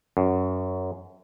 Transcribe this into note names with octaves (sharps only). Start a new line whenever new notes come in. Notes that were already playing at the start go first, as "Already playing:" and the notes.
F#2